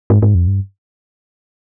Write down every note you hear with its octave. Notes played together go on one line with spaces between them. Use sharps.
G#2
G#2
F2
G2